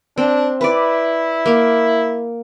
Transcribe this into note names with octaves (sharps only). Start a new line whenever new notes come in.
C4 D4
E4 B4 D5
A#3